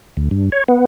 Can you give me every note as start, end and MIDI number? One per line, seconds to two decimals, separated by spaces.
0.17 0.29 38
0.31 0.50 43
0.52 0.64 73
0.68 0.85 59